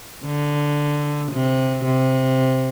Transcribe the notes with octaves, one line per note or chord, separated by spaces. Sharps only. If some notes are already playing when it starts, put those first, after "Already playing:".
D3
C3
C3